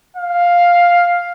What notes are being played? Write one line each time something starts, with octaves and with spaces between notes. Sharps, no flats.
F5